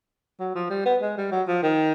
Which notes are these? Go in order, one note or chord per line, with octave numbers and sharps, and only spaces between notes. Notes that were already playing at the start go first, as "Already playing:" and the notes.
F#3
F3
G3
B3
G#3
G3
F#3
F3
D#3